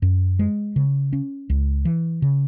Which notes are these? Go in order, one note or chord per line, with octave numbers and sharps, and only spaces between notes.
F#2
G#3
C#3
C#4
C#2
E3
C#3